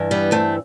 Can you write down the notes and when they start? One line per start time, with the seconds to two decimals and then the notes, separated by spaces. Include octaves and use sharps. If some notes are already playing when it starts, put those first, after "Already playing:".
Already playing: G2 E3
0.11 G3 B3
0.32 A3 C4